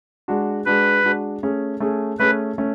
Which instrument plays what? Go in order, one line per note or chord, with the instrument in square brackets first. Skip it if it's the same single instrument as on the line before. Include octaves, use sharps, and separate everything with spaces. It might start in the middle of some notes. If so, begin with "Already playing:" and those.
[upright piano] G#3 D4 F#4
[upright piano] G#3 D4 F#4 [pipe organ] B4
[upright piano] G#3 D4 F#4
A3 C#4 G#4
A3 C#4 G#4
[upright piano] A3 C#4 G#4 [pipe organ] B4
[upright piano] A3 C#4